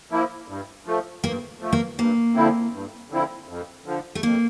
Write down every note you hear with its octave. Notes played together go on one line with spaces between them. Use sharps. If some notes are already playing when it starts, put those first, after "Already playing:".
F3 A#3 E4
G2
F3 A3
G2 A#3
F3 A3
A#3
G2 A#3
D3 F3 C4 E4
G2
D3 F3 C4 E4
F2
D3 F3
A3
F2 A#3